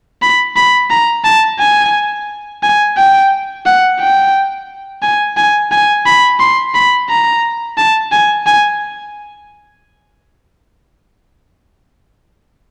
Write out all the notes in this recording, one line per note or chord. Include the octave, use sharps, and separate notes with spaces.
B5
B5
A#5
A5
G#5
G#5
G5
F#5
G5
G#5
G#5
G#5
B5
C6
B5
A#5
A5
G#5
G#5